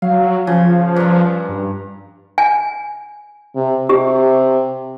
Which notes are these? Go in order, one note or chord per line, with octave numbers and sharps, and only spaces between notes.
F#3 F5
C#3 F3
G2 A#5
G2
G#5
C3
C3 G4